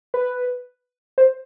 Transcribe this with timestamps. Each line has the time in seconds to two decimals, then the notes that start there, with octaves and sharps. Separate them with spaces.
0.14 B4
1.18 C5